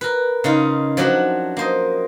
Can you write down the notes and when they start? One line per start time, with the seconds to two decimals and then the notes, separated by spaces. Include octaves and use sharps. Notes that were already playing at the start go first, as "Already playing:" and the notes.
0.01 A#4 B4
0.44 C#3 D#4 F4
0.97 F3 F#3 D4 F#4
1.57 A#3 C5 D#5